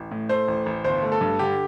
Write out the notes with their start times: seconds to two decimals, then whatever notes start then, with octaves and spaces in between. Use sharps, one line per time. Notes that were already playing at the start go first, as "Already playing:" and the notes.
Already playing: A1
0.11 A2
0.29 A3 C5
0.48 A1
0.66 A1
0.84 G1 C5
1.03 A3
1.12 A4
1.21 G2
1.39 D3 G4